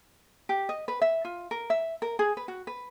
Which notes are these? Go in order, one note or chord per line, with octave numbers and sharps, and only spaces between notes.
G4
D#5
B4
E5
F4
A#4
E5
A#4
G#4
B4
F#4
B4